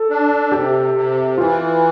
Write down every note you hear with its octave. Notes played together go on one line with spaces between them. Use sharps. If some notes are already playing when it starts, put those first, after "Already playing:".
Already playing: A4
D4
C3 G4
C3
E3 F4